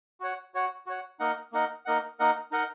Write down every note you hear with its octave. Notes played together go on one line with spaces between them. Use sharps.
F#4 C#5 F#5
F#4 C#5 F#5
F#4 C#5 F#5
A#3 D#4 A#4 D#5 F#5
A#3 D#4 A#4 D#5 F#5
A#3 D#4 A#4 D#5 F#5
A#3 D#4 A#4 D#5 F#5
D#4 A#4 D#5 F#5